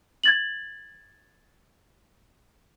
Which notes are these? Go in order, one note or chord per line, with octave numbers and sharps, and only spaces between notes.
G#6 A6 F#7